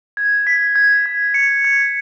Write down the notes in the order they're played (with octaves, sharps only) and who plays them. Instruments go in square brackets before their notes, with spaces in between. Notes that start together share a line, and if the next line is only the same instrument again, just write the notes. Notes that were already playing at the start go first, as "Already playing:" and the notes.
[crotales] G#6
B6
G#6
G#6
C#7
G#6